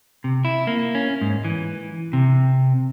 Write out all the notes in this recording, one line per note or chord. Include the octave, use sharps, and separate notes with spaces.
C3
E4
A#3
C#4
G#2
E3
C3